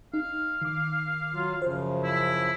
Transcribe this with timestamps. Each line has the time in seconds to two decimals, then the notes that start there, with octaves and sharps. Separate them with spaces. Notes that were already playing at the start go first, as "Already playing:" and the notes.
0.14 D#4 F5
0.62 D#3 D6
1.33 F#3 F4
1.62 F#2 C#3 F3 C5
2.04 E4